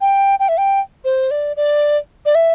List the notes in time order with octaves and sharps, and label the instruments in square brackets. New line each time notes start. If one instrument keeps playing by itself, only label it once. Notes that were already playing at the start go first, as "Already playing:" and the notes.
[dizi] G5
G5
E5
G5
C5
D5
D5
D5
E5